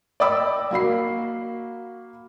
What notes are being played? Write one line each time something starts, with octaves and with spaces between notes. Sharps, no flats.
D5 D#5 G5 B5 D6 E6
A#3 F#4 B5 C7